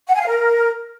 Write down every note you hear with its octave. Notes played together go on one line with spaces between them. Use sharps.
F#5
G#5
F5
A#4